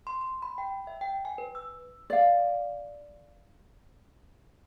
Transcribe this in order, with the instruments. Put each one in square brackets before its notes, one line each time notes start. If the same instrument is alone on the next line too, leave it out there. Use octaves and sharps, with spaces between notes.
[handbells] C6
C6
B5
G5
E5
G5
G#5
B4
E6
[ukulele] D5 F5